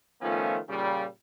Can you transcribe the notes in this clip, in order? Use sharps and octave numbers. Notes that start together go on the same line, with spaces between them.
D#3 F3 A3 B3 C#4 F4
A#2 C#3 G3